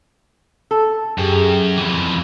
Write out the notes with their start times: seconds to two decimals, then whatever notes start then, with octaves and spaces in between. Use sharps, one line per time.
0.71 A4
1.18 F#2 G4 G#4 G5
1.77 F2 E3